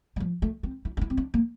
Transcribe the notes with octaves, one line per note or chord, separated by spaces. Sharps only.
G3
F3
A3
C4
E4
D4
E4
C4
D4
A#3